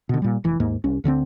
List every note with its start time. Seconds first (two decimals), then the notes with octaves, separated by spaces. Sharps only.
0.09 B2 D3
0.22 A#2 G3
0.44 F1 E3
0.60 D#2 G#2 A#3
0.84 C2 C#4
1.04 D2 D3 F3 C4